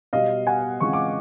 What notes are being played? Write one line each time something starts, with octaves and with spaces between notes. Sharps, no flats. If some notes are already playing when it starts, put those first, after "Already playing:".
B2 G3 B3 D#5 F5
F#5 G#5
C#3 E3 G#3 C4 F4 C#6
D6